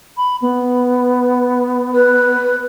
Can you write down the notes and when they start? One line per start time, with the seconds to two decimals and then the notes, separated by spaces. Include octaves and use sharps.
0.17 B5
0.42 B3
1.93 B4